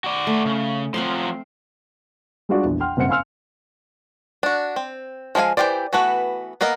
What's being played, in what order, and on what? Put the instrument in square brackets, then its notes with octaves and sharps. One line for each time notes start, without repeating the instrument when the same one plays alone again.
[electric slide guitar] F#4 D5
[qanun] A3
[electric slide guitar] C#3
[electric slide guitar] F3 F#3 [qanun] C4 F5 C6
[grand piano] G3 G#3 D4 F4 F#4 D5
A#1 E2
F#5 G5 C6 F6
F#1 G2 C4 F#5 C#7
F5 G#5 C6 E6 F6
[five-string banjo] D4 F#4
C4
F3 G#3 G#4 F5 G#5
E3 F#3 G4 C5 D5
E3 A3 B3 F#4 B4
A#3 B3 A#4 D#5